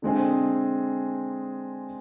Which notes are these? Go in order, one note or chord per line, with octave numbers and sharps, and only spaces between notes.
D3 G#3 C4 G#4